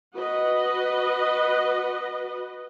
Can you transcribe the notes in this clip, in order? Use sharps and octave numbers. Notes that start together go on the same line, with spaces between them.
F#4 B4 D#5